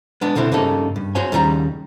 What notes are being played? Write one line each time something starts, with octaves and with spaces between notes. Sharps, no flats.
G#3 B3 D4
C2 B2 D3 C4 E4
G2 C#3 A#3 D#4 A4
G2
F#4 G#4 C5 C#5 G#5
D#2 C#3 G3 G#4 A#5